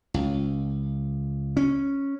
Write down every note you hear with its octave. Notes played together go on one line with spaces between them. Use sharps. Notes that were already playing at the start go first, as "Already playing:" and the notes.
C#2
C#4